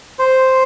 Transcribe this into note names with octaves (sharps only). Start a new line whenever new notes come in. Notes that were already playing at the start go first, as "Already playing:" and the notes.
C5